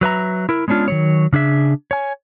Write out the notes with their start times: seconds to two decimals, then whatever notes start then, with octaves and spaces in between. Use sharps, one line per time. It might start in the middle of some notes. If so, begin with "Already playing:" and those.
0.01 F#3 B4 E5 A#5
0.49 E4 A#4
0.68 G#3 B3 C#4 D4 F4
0.88 D#3 F#3 C#5
1.33 C#3 D4 G#4 E5
1.91 C#5 G#5